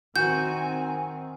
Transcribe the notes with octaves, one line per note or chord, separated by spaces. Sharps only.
D#3 C4 F#4 G#5 G6